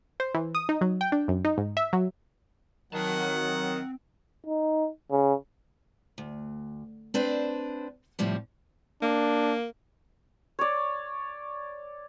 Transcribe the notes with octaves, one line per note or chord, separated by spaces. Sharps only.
C5
E3
D#6
D#4
F#3
G5
D4
F#2
D#4
G#2
E5
F#3
D#3 F#3 C4 F#5 A5
D#4
C#3
D2
C4 D4 B4 C5
F2 A2 C3 F3 G3
A#3 D4
C#5 D5